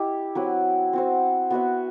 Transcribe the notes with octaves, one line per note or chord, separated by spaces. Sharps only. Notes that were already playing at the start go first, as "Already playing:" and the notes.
Already playing: E4 G4 D#5
F#3 C4 E4 B4
C4 F#4 C5
B3 F#4 B4 E5